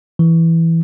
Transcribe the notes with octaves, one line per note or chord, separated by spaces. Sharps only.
E3